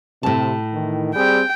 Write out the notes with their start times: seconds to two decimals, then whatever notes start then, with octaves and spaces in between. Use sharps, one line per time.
0.23 A2 C3 A5
0.73 D#3 E3
1.15 G3 C4 G#4 G5